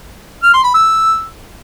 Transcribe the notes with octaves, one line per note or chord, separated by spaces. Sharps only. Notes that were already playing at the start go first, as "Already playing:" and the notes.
F6
C6
B5
E6